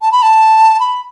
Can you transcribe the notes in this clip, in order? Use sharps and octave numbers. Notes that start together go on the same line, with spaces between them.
A5
B5
A5
B5